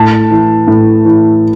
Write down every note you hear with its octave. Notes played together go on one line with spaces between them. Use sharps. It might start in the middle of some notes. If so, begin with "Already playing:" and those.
Already playing: A2 A5
E3
A2
E3